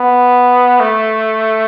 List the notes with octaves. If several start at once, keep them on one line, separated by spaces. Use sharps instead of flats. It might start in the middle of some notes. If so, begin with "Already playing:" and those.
Already playing: B3
A3